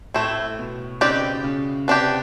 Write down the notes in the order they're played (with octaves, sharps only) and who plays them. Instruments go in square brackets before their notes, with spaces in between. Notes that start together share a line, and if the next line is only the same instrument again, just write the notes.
[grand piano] A2 [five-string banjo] A3 C4 E4
[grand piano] B2
[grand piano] C#3 [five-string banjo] C4 D#4 G4 B4 D5
[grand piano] C#3
[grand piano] C3 [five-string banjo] B3 D4 G4